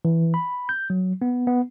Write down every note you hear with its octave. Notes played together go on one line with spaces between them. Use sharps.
E3
B5
G6
F#3
B3
B3